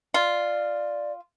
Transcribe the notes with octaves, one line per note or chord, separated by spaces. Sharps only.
F4 D5